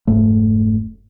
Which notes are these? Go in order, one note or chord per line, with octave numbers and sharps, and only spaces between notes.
F1 G#2 A3